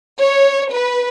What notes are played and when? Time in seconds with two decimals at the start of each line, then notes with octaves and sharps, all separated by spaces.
0.20 C#5
0.71 B4